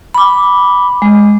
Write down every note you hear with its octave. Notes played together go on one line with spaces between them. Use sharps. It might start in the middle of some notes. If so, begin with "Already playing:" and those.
B5 D6
G#3